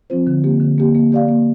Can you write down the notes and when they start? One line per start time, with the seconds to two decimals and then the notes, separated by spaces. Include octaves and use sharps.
0.10 F3 C4 F4 C5
0.27 D3
0.44 A#3 G4
0.60 D3
0.78 A#3 G4
0.95 A#3
1.12 G4 D5 F5
1.29 A#3